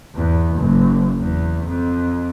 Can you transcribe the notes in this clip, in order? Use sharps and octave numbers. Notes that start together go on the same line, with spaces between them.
E2
F#1
E2
F2